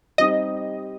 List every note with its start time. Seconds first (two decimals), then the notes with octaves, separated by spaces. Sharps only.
0.18 G3 C4 D#4 G4 D#5